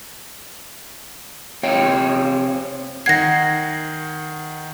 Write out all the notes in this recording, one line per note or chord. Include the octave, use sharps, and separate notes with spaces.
C3 C#5 F5 G5
D#3 F#5 G#6 A#6 C7